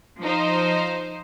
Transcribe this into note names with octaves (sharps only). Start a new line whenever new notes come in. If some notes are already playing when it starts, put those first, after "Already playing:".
F3 D#4 C5